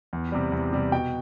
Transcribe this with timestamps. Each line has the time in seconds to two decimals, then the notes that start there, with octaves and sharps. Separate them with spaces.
0.13 E2
0.32 C3 G3
0.52 E2
0.73 C3 G3
0.92 B2 G5